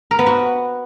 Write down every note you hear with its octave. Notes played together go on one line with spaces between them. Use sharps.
A#4
B3
F#4